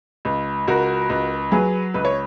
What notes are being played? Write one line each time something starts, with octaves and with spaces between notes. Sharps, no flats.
C#2
C#2 F#4 A#4
C#2
F#3 G#4 B4
C#2 B4
C#5